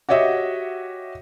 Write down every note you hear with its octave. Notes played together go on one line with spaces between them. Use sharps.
F#4 G4 C#5 D#5 E5 F#5